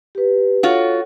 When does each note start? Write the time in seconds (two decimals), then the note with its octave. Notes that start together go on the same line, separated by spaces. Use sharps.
0.15 G4 B4
0.63 F4 F#4 A4 C#5